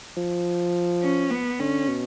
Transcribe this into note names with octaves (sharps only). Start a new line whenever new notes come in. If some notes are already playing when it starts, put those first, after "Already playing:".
F3
C#4
B3
D3 C#4
B2